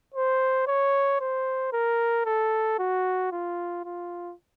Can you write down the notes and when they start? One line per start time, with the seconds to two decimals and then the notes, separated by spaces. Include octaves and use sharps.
0.14 C5
0.67 C#5
1.20 C5
1.73 A#4
2.26 A4
2.79 F#4
3.32 F4
3.85 F4